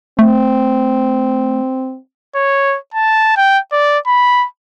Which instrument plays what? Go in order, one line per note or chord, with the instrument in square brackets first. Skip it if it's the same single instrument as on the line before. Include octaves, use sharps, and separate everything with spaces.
[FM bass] A3 [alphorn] C4
[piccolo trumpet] C#5
A5
G5
D5
B5